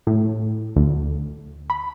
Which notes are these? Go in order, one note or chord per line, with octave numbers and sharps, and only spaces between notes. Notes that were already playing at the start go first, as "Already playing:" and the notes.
A2
D2
B5